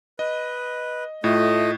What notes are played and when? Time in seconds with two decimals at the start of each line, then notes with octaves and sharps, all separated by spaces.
0.19 B4 D#5
1.24 A2 A3 F4 D#5